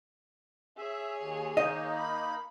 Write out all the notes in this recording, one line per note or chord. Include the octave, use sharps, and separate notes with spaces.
G#4 C#5 E5
D#2
D#3 A#3 D#4 D#5
B5